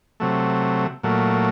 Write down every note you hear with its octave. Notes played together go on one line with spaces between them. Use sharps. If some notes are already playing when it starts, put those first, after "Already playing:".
C3 F#3 A3
A#2 F#3 A3